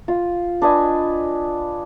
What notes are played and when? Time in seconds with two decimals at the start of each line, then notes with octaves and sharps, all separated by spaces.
0.08 F4
0.62 D4 B4 D#5 G#5